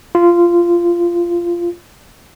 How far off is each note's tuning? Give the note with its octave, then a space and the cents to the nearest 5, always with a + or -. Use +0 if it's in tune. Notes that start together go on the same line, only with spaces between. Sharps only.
F4 -15